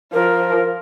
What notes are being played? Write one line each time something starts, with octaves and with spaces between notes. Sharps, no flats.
F3 A#4